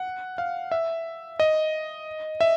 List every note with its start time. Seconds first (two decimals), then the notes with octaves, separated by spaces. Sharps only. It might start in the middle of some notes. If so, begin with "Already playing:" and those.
Already playing: F#5
0.38 F5
0.71 E5
1.40 D#5
2.41 E5